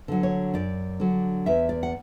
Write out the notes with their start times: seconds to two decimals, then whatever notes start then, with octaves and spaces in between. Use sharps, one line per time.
0.08 D3 F#3
0.23 C#5
0.54 F#2 D5
1.00 D3 F#3
1.46 E2 E5
1.69 D5
1.83 F#5